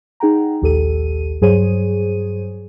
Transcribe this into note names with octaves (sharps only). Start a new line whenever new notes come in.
D#4 G#4 F#5 G5 A#5
A#1 D#2 G4 A4 D#7
G2 F#3 G#4 C5 C#5 D#7